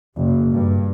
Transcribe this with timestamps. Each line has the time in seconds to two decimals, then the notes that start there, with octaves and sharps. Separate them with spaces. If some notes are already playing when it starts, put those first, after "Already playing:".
0.17 F#1
0.51 G2